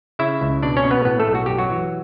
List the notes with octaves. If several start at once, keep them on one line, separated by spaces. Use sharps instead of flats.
C#3 E4 E5
C#2
B2 D4 D5
C#4 C#5
B2
B3 B4
A2 B3 B4
A3 A4
B1
F#4
F#2 G4
F#3 F#4
E3